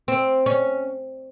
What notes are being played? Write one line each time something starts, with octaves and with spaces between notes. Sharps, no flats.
C4
C#4